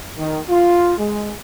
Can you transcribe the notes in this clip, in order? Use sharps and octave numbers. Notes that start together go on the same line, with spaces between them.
D#3
F4
G#3